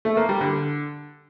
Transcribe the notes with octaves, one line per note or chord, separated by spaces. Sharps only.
A3
A#3
G3
D3